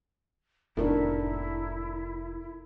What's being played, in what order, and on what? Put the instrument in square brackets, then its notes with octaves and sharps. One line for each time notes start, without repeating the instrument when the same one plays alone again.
[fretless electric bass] F1 [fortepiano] A2 D#3 D4 [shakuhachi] E4 [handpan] A4 A#4